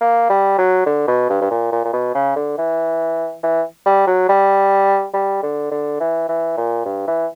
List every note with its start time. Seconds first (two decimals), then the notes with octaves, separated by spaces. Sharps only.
0.01 A#3
0.30 G3
0.58 F#3
0.86 D3
1.08 B2
1.29 G2
1.41 G2
1.51 A#2
1.72 A#2
1.85 A#2
1.93 B2
2.15 C#3
2.36 D3
2.58 E3
3.43 E3
3.86 G3
4.07 F#3
4.29 G3
5.14 G3
5.43 D3
5.71 D3
6.00 E3
6.29 E3
6.57 A#2
6.86 G2
7.07 E3